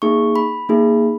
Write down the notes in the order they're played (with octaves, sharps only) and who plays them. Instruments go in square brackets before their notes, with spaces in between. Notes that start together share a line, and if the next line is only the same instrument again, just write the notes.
[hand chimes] A#3 D#4 G#4 C#6
B5
A#3 D#4 G#4